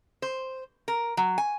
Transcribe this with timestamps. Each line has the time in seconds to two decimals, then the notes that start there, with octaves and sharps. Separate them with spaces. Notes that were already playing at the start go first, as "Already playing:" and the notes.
0.22 C5
0.88 A#4
1.17 F#3
1.38 G#5